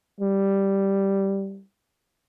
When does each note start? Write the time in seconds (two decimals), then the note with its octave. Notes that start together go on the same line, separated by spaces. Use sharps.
0.21 G3